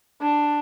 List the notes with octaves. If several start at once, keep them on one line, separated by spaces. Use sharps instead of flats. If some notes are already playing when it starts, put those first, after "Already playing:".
D4